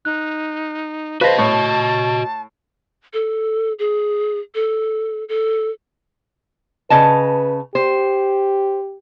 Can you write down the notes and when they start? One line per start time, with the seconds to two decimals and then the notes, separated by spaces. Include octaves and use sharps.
0.05 D#4 F#6
1.21 F#4 B4 C5 D#5 F5 A5 A#6
1.38 A2 C#6
3.13 A4
3.79 G#4
4.55 A4
5.29 A4
6.90 C#3 B4 D#5 A5
7.75 G4 C5